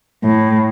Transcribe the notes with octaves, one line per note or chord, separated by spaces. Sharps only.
A2